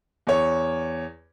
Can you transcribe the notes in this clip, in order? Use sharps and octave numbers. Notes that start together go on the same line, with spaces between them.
E2 C#5